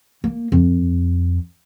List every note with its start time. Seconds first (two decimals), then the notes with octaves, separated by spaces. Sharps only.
0.24 A#3
0.52 F2